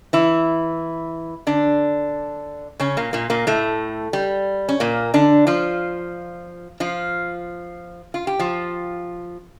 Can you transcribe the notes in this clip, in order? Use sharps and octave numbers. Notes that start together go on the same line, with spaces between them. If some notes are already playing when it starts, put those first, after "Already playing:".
E3 E4
D3 D4
C#3 C#4
A#2 A#3
A#2 A#3
A#2 A#3
A2 A3
G3
C#4
A#2 A#3
D3 D4
F3 F4
F3 F4
F4
G4
F3 F4